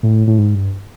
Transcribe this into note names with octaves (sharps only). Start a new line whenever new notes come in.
A2
A2
G#2
G2